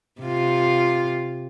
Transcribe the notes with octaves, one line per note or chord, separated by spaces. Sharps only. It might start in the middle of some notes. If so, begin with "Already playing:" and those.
C3 F4